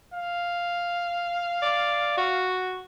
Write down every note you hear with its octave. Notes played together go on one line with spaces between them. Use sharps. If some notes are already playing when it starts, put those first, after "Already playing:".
F5
D5
F#4